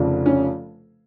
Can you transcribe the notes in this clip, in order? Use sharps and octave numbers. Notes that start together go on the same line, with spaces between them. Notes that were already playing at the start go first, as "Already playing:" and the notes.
Already playing: F1 F2 C#3 F3
C#4